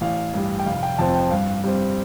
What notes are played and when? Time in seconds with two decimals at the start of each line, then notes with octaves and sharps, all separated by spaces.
0.01 A1 F5
0.34 G2 G3
0.59 G5
0.66 F1 F5
0.83 G5
0.98 F2 F3 C4 A5
1.15 G5
1.31 G2 F5
1.64 G3 C4